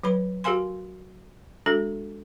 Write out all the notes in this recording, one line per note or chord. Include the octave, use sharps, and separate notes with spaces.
F#3 B4 B5
F#4 G4 A#4 F5 G#5 C6
G#3 D4 F#4 A4